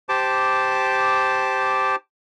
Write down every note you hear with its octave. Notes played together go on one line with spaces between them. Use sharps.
G4 C5 A5 D6